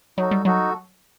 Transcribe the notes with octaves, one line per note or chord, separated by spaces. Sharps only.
F#3 D#4 F#4 A4
G3
F#3 D#4 F#4 A4